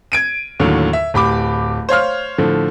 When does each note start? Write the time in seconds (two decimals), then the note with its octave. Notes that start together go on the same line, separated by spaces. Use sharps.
0.12 G#6 D7 D#7
0.60 D#2 A2 D3 F#3
0.93 E5
1.14 D1 G4 B5 D6
1.89 C5 C#5 F5 F6
2.38 A2 D3 F3